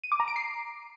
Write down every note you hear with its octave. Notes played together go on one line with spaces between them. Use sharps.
D#7
D6
A#5
D7
C7